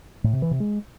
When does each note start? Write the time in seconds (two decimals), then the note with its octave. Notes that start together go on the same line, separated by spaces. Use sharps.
0.24 A2
0.33 C3
0.42 E3
0.51 C3
0.60 G#3